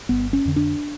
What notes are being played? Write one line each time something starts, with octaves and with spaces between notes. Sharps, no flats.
G1 B3
C#4
F2 D3
D4